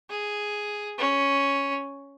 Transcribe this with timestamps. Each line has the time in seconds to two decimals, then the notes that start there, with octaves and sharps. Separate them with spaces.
0.10 G#4
0.98 C#4